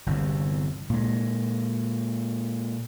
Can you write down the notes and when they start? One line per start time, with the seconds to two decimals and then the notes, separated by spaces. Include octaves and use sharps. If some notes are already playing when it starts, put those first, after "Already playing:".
0.06 G1 E2 C3
0.90 A#2 G#3